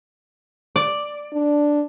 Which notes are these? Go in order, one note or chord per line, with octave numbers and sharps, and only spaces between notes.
D5
D4